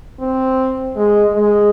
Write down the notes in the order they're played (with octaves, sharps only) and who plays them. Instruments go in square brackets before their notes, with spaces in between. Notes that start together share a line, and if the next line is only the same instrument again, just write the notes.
[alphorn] C4
G#3
G#3